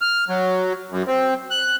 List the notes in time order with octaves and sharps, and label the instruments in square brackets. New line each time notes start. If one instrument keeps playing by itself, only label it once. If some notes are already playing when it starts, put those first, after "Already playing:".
[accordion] F6
F#3
F#2
C4
F#6